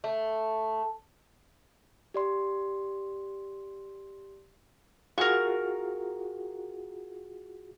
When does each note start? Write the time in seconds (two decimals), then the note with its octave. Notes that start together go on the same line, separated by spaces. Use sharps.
0.04 A3
2.14 G4 D5 C6
5.18 F4 F#4 G#4 A#4 C#6